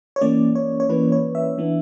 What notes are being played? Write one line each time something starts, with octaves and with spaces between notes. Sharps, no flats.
C#5
E3 A#3 C#4 D5
C#5
C#5
E3 A#3 C#4 B4
C#5
E5
E3 B3 D4